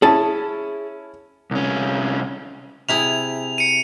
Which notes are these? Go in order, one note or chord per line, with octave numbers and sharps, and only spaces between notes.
C#4 E4 G#4 A5
C2 C#4
C3 E4 G#4 F7
C#7 D#7